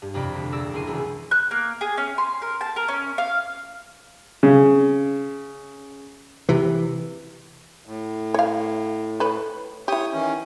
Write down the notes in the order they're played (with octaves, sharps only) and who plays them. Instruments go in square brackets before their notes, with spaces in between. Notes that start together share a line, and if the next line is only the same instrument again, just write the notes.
[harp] G2
F2 C3 F4 D5 B5
D2
A#1 D5 E6 A#6
F#1 E4 A#4 C6 D#7
E1 C#2
[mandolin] F#6
A#3
G#4
C#4
C6
A#4
A5
A#4
C#4
F5
[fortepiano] C#3
[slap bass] C3 E3
[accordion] A2
[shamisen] C#5 F5
A4 B4 C#5
[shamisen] E4 G4 [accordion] C#5 D#6
[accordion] D#3 E3 C#4